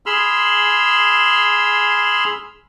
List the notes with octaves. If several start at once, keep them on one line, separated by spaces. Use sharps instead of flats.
G#4 B5 C6 E6 F6